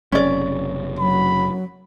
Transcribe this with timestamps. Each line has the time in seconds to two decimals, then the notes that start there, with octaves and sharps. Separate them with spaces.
0.12 F#1 F#2 C3 C#4 D5
0.99 F#3 B5